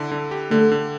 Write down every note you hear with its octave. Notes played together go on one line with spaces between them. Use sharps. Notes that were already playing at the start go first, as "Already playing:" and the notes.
Already playing: D3 E4
D3
G4
D3 A3
D3